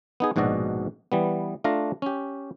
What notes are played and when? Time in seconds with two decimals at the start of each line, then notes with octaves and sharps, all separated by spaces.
0.20 B3 D#4 G#4
0.36 A#1 G#2 B2 F#4 D5 D#5
1.12 E3 G3 B3
1.64 A3 D4 F4 F5 A#5
2.02 C#4 G4